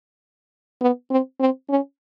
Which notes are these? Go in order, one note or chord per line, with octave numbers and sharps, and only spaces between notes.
B3
C4
C4
C#4